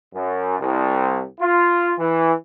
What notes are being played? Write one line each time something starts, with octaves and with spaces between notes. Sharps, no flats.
F#2
C2
F4
E3